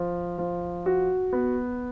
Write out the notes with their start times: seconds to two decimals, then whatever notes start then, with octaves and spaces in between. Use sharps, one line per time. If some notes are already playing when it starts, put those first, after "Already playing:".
Already playing: F3
0.38 F3
0.86 F#4
1.33 B3